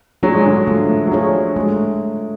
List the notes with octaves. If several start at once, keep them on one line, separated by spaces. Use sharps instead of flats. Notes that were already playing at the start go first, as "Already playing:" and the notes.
F#3 D4 G#4 C#5
G#3
D3 F#3
F3 A3
F#3
F3 D4 G#4 C#5
G#3 A3